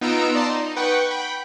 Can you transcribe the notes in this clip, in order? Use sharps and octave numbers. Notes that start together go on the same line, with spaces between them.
B3 D#4 F4 A#5 E6 D7
D5 A5 A#5 C6
D#4
B4 F#5 G5 C#6
G5 B5